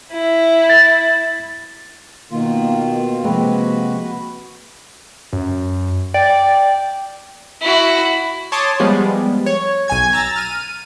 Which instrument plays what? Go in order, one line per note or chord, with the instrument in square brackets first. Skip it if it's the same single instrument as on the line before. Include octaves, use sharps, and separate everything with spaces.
[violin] E4
[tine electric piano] A6
[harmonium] B2 D#3 F4 [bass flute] A#3
[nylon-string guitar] C3 G#3 A#3 [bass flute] F3 [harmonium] F#4 B4
[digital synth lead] F#2
[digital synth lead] D5 [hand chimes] G5
[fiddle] E4 F#4
[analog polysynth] C#5 A5 C6 D6 D#6
F3 G3 G#3 B3
C#5
B1 G#5 G#6
A#5 E6 A6
F6 D#7